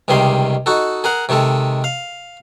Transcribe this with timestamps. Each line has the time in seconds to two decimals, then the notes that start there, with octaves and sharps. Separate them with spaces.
0.08 C#2 C3 D#3 G3 G#4 C6
0.66 D#4 F#4 A4
1.04 G#4 A#4 F#5
1.29 C3 D#3 G#3 A4
1.84 F5